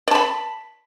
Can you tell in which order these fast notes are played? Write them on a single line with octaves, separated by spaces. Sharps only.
D5 A5 B5